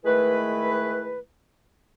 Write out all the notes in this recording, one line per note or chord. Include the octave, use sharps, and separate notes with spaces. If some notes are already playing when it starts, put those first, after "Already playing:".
D#3 G#3 A3 E4 B4